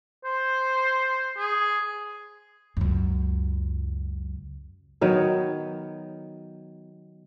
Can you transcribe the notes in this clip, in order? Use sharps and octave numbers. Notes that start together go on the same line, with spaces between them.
C5
G#4
C#2 F#2
D#3 F#3 B3